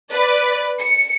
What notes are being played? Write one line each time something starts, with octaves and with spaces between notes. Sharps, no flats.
B4 D5
C#7